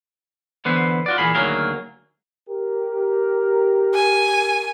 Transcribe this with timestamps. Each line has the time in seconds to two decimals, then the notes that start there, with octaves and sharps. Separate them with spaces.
0.65 D3 E3 B3 B4 C5
1.06 F4 F#4 D5
1.18 A#2 E3 A#3 G#4 B5
1.35 D2 D#3 F#3 A#3 G#4 A#4
2.48 G4 A#4
3.95 G#5